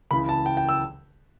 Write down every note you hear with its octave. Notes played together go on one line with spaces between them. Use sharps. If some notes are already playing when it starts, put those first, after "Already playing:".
C#2 C#3 E3 B5
A5
G5
G5
E6